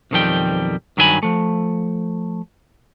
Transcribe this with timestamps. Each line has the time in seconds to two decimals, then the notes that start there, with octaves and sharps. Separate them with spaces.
0.11 B1 F2 D#3 F3 G3 G5
0.97 G2 D#3 F#3 E4 G#5 B5
1.23 F3 A3